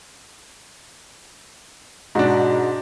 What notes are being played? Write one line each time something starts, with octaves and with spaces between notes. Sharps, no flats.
G#2 B2 D4 F#4